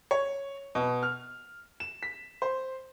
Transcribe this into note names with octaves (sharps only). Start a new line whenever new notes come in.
C#5
B2
F6
E7
B6
C5